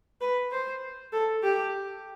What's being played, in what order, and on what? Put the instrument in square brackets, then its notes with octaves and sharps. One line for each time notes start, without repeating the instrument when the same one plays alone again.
[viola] B4
C5
A4
G4